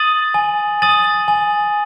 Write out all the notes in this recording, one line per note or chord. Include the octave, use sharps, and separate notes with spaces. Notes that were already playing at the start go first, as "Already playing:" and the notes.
Already playing: D#6 A6 D#7 F#7
G#5
D#6 A6 D#7 F#7
G#5